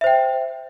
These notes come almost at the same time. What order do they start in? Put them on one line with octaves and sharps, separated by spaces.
E5 C5 G5